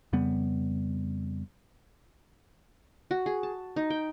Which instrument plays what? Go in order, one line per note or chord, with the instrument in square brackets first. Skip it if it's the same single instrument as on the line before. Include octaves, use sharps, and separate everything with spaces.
[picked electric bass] F2 C#3 G3 B3
[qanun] F#4
G#4
A5
D#4
G5